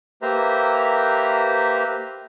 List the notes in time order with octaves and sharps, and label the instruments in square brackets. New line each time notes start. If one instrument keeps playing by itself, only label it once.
[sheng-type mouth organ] A#3 G4 B4 C5 E5 A#5